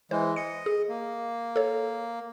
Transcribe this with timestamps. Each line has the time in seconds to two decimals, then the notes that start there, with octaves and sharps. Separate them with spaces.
0.11 E3 G#3 C5
0.36 D#5 C#7
0.66 G#4
0.89 A#3
1.56 A4 C#5